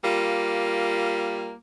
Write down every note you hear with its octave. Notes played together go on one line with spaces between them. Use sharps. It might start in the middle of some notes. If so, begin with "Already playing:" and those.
G3 A#3 F4